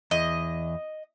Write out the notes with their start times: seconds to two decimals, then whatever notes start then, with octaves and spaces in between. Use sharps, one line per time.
0.11 E2 D#5